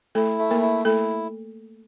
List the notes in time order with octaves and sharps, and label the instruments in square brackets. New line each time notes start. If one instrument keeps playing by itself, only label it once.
[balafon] A3 A4 [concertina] E4
[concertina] A3
[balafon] A#3 A#4
[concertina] E4
[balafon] A3 A4 [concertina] E4